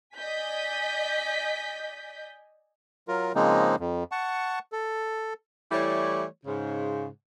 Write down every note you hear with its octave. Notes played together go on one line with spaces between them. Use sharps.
D5 D#5 G#5 G6 B6
F#3 F4 A#4
C#3 F3 G#3 A#3 C4 D#4
F2
F#5 A5 C#6
A4
E3 G3 A3 E4 C#5 D5
G#2 C#3